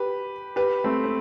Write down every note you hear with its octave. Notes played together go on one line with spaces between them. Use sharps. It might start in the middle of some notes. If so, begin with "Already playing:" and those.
Already playing: G4 B4
G4 B4
A3 C4
C4